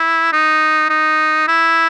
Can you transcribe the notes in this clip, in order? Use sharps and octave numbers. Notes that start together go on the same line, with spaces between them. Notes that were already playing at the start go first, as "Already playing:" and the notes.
Already playing: E4
D#4
D#4
E4